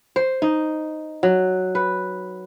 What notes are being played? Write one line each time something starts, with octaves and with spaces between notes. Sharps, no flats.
C5
D#4
F#3
B4